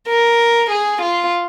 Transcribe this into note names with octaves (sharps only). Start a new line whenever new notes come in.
A#4
G#4
F4